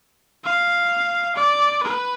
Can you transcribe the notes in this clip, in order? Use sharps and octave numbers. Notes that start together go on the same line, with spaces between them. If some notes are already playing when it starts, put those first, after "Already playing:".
F5
D5
B4